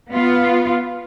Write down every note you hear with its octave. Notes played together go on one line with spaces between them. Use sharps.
B3 F4